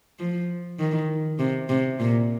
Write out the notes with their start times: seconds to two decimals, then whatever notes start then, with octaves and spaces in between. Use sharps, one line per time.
0.19 F3
0.79 D#3
1.39 C3
1.69 C3
2.00 A#2